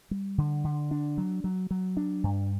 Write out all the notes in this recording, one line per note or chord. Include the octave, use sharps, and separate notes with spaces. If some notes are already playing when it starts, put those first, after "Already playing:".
G3
D3
D3
D4
F#3
F#3
F#3
D4
G2